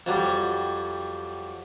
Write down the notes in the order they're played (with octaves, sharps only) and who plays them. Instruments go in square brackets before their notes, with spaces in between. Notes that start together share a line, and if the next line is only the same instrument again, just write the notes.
[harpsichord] F2 F#3 G3